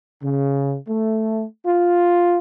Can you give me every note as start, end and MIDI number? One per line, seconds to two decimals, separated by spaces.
0.23 0.75 49
0.89 1.45 57
1.67 2.39 65